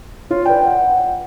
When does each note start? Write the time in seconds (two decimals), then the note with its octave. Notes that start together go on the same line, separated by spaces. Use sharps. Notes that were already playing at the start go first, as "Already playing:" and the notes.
0.31 F4 C#5
0.45 B4 D5 G5
0.64 F#5